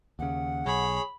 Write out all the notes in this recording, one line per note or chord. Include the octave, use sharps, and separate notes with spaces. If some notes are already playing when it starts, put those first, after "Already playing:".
D#2 C#3 F#5
B1 G#4 C#5 B5